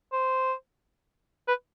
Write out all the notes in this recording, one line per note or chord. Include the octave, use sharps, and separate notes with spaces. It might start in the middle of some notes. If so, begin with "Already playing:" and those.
C5
B4